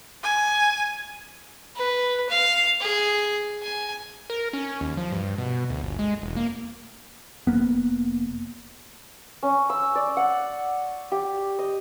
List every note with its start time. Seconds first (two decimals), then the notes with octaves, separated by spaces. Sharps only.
0.23 G#5
1.76 B4
2.29 F5
2.81 G#4
3.63 G#5
4.30 A#4
4.53 C#4
4.81 D#2
4.97 F3
5.12 G2
5.38 B2
5.70 D2
5.84 G1
5.99 G#3
6.22 E1
6.36 A#3
7.47 F1 E2 A#3 B3
9.43 C#4
9.70 E6
9.95 D5
10.17 F#5
11.12 G4
11.59 D#5